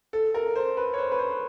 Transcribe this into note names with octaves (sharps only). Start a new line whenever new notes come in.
A4
A#4
C5
B4
C#5
C5
B4
C5